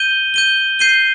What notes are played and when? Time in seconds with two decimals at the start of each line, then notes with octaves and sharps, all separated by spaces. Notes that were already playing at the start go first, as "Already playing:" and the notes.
Already playing: G6 D#7 G7
0.34 G6 D#7 G7
0.79 G6 C7 D#7 G7